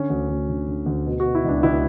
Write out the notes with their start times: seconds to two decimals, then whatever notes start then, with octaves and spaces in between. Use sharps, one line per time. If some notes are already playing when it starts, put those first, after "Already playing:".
Already playing: D3 C#4
0.10 D2
0.29 D2
0.49 D3
0.67 D3
0.86 D2
1.06 B2
1.20 F#4
1.25 B2
1.35 E4
1.44 C#2 D4
1.63 C#2 E4